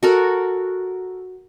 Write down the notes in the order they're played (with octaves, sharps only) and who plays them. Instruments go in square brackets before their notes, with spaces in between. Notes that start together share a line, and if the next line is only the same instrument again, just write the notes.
[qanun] F#4 A4 A#4